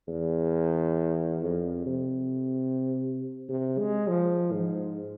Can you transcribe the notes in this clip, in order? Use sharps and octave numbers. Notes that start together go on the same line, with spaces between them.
E2
F2
C3
C3
G#3
F3
G#2